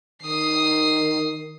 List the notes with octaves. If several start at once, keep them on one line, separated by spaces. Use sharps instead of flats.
D#3 D#6 C7